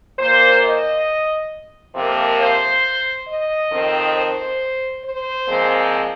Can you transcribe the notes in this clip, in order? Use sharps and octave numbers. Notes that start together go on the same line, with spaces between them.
A#2 A#3 C5
D#5
F2 C3 F3 A#3
C5
D#5
F2 D#3 C4
C5
C5
A#2 F3 G#3 C4